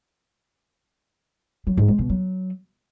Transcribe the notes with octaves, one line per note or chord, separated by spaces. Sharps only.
F#3
G#2
G#3
B2
F#3